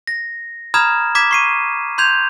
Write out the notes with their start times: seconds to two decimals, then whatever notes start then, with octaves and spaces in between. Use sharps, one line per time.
0.07 A#6
0.74 A#5 B5 D#6 F6 G#6 E7
1.15 D6 G#6 B6 E7
1.31 C#6 C7 D#7
1.98 C6 G6 G#6 F7